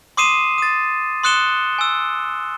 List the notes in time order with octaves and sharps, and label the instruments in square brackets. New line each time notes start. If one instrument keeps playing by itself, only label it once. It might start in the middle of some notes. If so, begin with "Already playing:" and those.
[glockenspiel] C6 D6 D#6 C7 D#7 E7
D#6 A6
C6 D#6 F#6 C#7 E7 G7
G#5 E6